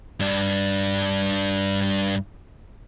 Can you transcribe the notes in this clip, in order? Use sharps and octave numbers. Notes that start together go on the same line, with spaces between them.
G2 D4